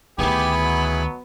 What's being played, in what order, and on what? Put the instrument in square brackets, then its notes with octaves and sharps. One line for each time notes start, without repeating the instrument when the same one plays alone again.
[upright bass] D2 D#3 [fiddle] B3 [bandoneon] E4 G#4 [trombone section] G4
[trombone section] B2 F#3